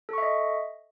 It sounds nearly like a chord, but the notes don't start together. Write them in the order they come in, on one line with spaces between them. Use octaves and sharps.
A4 C#6 E5 D#5